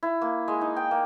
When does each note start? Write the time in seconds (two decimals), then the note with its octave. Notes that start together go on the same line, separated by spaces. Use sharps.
0.03 E4
0.21 A#3
0.48 G#3
0.61 D#4
0.76 G5
0.91 A#3